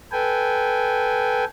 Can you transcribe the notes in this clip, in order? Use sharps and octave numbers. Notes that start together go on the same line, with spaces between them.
A4 B4 G5 G#5